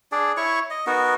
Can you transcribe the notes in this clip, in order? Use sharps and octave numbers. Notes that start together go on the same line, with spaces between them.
D4 G#4 D5
E4 C#5 C#6
D#5
B3 D#4 F#4 A#4